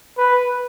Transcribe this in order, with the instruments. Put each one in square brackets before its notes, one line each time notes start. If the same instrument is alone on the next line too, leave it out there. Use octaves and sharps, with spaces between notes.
[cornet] B4